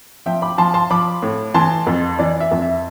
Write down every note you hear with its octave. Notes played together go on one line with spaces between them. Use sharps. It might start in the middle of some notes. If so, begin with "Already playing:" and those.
F3 E5 G5
B5 D6
F3 A5 C6
A5 C6
F3 B5 D6
A2
E3 A5 C6
F2
E3 D5
E5
F2
E5